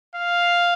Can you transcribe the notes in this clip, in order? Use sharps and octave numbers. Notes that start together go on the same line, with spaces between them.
F5